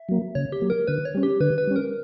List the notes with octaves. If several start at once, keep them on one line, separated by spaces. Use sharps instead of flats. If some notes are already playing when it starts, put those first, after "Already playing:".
Already playing: E5
F#3 A#3
C#3 C#5
G4
F#3 A#3
A#4
D3 B4
C#5
G3 C#4
G4
D3 B4
B4
G3 C#4
A#4